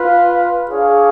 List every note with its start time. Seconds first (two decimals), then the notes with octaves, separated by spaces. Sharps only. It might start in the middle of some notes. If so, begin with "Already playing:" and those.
Already playing: F4 B4 F5
0.70 D4 G#4 C#5 F5